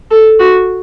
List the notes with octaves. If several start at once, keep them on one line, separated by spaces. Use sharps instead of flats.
A4
F#4